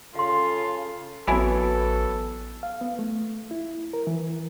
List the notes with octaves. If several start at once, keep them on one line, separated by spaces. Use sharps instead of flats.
C#3 F4 A4 F5 C6
A1 E3 F#3 B3 E4 A4 G#5
F5
B3
A3
E4
A#4
E3